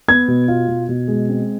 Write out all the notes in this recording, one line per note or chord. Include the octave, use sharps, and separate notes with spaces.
B3 G#6
B2
F4
B2
B2
G#3
C4